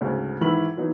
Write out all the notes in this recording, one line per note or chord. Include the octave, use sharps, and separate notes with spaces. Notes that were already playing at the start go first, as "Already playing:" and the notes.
D2 G#2 C#3
G#2 D#3 E3 E4 B5 F#7
E3 F#3 B3 D#4